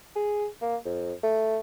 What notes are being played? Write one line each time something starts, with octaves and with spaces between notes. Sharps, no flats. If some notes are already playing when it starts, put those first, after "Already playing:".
G#4
A#3
F2
A3